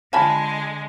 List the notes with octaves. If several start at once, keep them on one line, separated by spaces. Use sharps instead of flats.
D3 G#3 F4 G#5 A5 B5